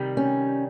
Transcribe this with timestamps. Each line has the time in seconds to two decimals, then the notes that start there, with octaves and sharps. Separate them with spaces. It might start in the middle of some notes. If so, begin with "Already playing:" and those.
Already playing: C3 D#3 G3
0.17 C#4